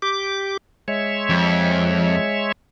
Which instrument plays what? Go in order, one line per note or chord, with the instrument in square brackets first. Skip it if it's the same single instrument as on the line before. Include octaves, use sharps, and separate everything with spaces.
[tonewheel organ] G4 D6
G#3 C#5 E5
[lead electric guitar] F2